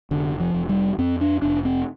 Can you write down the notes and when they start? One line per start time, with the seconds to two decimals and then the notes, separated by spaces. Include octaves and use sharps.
0.11 F1 D3
0.40 F3
0.54 F1
0.69 G3
0.98 F2 C4
1.21 D4
1.42 F1 D4
1.65 C4